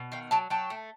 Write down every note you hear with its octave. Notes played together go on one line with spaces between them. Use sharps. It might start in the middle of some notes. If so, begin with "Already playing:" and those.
Already playing: B2
D#3 F5 G5
F#3 G5 A5
F#3 G5 A5
A3